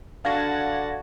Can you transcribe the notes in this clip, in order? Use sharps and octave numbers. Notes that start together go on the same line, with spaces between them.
D3 D4 F#4 F5 F#5 A5 G#6 A#6